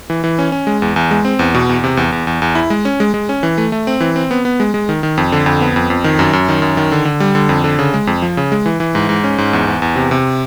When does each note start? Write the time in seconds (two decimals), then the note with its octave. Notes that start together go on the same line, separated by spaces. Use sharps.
0.10 E3
0.24 E3
0.39 C#4
0.52 C#4
0.67 G#3
0.82 E2
0.96 E2
1.11 G#3
1.25 C4
1.39 E2
1.54 B2
1.69 E2
1.84 C3
1.97 E2
2.12 E2
2.27 E2
2.42 E2
2.55 E4
2.70 G#3
2.85 C#4
3.00 G#3
3.14 G#3
3.29 C#4
3.43 E3
3.58 A3
3.72 A3
3.87 C4
4.00 E3
4.16 C4
4.31 B3
4.45 B3
4.60 G#3
4.74 G#3
4.89 D#3
5.03 D#3
5.18 F2
5.32 D3
5.46 F2
5.61 B3
5.76 F2
5.90 F2
6.04 D#3
6.19 F#2
6.33 F#2
6.48 D#3
6.62 F#2
6.77 D#3
6.92 D3
7.05 D3
7.20 G3
7.35 D3
7.49 F2
7.64 D3
7.79 C#3
7.94 G#3
8.07 F2
8.22 F3
8.37 C#3
8.52 G#3
8.66 E3
8.80 E3
8.95 G#2
9.09 G#2
9.24 C#4
9.38 G#2
9.53 E2
9.67 E2
9.82 E2
9.96 C3
10.11 C3